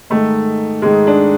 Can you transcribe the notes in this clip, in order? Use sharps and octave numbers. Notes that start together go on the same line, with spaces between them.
G#2 D#3 A3
G#2 D#3 G#3
D4